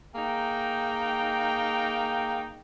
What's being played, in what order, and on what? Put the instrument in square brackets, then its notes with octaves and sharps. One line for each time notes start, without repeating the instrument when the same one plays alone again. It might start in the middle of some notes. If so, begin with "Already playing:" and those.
[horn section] A#3 D#4 G#4 G5